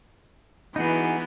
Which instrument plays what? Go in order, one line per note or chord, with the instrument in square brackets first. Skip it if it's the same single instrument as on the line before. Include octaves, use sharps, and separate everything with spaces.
[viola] E3 B3 [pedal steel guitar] D#4 F#4 G#4